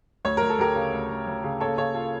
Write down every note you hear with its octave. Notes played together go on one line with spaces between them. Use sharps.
D2 C#5
D2 A#4
A4
D2 G4 A#4
C#3
D2
D2
D2
C#3
A#3 A4 C#5
C#3 A4 C#5
F4 A4